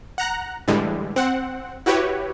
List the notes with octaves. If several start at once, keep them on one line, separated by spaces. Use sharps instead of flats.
F#5 A#5 F#6
A2 D3 E3 G3 G#3
C4 F#5
E4 F#4 G4 B4 C#5